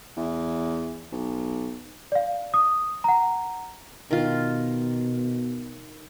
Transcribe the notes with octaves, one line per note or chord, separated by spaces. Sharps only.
E2
B1
D5 F5
D#6
F#5 A#5
B2 D#3 F4